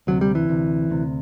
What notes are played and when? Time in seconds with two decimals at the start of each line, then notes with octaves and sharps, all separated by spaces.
0.07 D2 C3 F#3
0.21 G3
0.35 E3
0.49 D2 C3
0.90 D2 C3